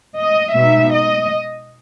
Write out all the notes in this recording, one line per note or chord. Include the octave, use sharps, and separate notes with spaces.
D#5
B2 G#3 D#4 E5
D#5